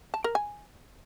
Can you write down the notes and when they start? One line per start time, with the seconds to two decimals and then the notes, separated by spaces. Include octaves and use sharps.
0.14 A5
0.24 A#4
0.35 G#5